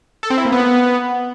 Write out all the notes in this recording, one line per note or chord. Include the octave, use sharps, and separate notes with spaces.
A4
C4
E4
A#3
B3